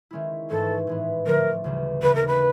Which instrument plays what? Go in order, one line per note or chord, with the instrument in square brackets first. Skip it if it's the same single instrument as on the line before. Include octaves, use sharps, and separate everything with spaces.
[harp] D#3 G#3 C#4 E4
[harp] G#2 E3 A3 C#4 [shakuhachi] A4
[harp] A2 E3 G#3 B3
[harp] D3 F3 A3 [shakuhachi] A#4
[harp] D2 C#3 E3 G3
[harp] D#2 C#3 E3 [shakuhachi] B4
[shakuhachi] A#4
B4